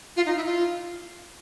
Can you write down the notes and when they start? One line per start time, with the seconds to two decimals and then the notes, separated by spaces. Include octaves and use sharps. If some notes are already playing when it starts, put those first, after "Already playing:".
0.16 F4
0.26 D#4
0.36 E4
0.46 F4